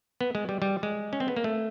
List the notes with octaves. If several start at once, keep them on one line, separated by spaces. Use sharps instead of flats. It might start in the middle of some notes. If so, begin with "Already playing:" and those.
B3
G#3
G3
G3
G#3
C#4
C4
B3
A#3
A3